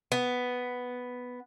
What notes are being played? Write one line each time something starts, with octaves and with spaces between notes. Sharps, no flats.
B3